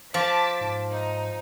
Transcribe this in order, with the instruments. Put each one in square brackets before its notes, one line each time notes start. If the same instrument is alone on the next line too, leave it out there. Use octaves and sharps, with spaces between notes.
[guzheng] F3 [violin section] A5 D6 B6
[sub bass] G#2
[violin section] D#4